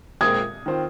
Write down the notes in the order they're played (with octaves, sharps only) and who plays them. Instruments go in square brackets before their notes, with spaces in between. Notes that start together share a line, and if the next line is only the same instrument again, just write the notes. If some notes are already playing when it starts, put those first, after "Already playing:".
[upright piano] A#2 G#3 C4 F4 A#4 [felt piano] D#6 G#6
[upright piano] D#3 C4 F4 C5